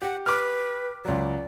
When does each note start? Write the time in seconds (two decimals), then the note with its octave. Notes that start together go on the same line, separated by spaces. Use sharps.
0.02 G4 F#5
0.26 B4 D6 F6
1.05 C#2 F#3 D5